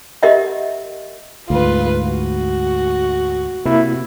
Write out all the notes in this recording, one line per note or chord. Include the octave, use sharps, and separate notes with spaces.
G4 A#4 D#5 E5 F#5
D2 G#2 F4 B4
F#4
C3 A#3 E4